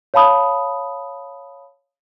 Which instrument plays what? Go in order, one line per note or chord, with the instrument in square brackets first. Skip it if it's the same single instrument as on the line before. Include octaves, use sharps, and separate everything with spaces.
[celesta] C#5 F5 A5 B5 D#6